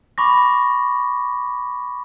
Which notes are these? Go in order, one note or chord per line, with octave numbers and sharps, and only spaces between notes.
B5 C#6 D6 A#6